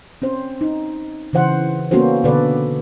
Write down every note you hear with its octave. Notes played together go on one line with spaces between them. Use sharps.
C4 C#4 C5
D#4
C#3 E3 C5 F#5
A#3 B3 C#4 F#4 A4 C5
B2 D3 A4 B4 D5